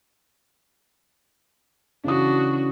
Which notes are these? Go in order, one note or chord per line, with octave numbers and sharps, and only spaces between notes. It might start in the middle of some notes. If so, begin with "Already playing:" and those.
C#3 E3 D4 F#4 D#6